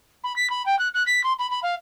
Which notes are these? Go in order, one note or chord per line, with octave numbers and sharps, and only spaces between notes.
B5
B6
B5
G5
F#6
F#6
B6
C6
B5
B5
F5